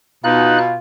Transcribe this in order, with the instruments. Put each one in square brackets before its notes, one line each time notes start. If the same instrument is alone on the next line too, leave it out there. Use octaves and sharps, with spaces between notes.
[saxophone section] B2 [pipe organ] D#4 F#6 [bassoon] F4